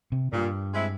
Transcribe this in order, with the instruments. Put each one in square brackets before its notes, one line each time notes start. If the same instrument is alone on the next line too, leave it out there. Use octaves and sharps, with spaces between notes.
[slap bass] C3
[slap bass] G2 [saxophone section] A#2
[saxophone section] G#3 C4 E4